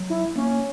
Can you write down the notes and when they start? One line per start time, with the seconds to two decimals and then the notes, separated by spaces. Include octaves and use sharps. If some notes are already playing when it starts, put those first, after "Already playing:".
Already playing: F#3
0.10 E4
0.36 A#3 C#4